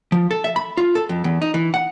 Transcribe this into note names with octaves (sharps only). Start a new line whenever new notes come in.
F3
A4
E5
B5
F4
A4
F2
E2
D#4
E3
F#5